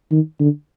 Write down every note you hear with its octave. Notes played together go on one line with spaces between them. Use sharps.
D#3
D3